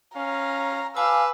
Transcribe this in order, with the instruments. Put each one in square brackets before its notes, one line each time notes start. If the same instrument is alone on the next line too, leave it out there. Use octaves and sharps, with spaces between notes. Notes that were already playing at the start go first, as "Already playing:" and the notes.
[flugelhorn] C#4 [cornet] F5 [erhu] A#5
[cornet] B4 [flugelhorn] F5 [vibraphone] G#5 A5 D6 [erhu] E6